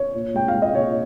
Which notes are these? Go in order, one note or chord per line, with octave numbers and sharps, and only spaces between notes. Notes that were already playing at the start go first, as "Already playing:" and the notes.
Already playing: C#5
A#2
G#3 G5
F5
G#3
D#5
A#2 C#5